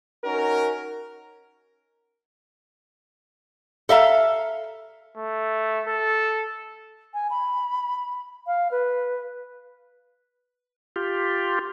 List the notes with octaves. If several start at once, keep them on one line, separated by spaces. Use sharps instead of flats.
C#4 D#4 F#4 A#4
A4 E5 F5 A#5
A3
A4
G#5
B5
F5
B4
F4 G4